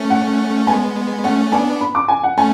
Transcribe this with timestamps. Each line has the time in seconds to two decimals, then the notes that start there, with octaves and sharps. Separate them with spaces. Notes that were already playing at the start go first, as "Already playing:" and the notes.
Already playing: A3 C#4
0.10 F#5
0.67 G#3 B3 G#5
1.24 A3 C#4 F#5
1.52 B3 D4 G#5
1.81 B5
1.95 D6
2.08 G#5
2.23 F#5
2.38 A3 C#4 G#5